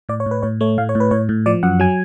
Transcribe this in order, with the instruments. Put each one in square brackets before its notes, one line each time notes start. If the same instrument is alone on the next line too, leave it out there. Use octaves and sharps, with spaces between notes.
[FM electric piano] A2 D5
C#5
A2
B4
A2 C#5
A3 C#5
A2 F5
C#5
A2
B4
A2 C#5
A2
F3 D5
F#2 F#5
F#3 G#5